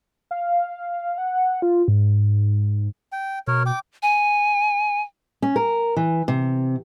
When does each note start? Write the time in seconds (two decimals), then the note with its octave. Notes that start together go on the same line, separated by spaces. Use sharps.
0.31 F5
1.18 F#5
1.62 F4
1.88 G#2
3.12 G5
3.47 B2 A#4 C#5
3.66 G5 D6
4.03 G#5
5.42 C#4
5.56 A#4
5.96 E3
6.28 C3